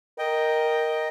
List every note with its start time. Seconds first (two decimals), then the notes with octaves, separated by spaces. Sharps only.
0.18 A#4 D#5 G5